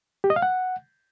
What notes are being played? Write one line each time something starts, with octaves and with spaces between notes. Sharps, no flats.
G4
D#5
F5
F#5